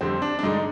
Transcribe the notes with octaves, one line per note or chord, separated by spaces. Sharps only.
F2 D3 G3 C4
D4
D4
G2 D3 G#3 D#4